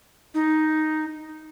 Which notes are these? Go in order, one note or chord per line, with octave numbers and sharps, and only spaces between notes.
D#4